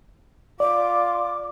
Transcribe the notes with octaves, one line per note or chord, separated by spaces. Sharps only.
F4 D5 D6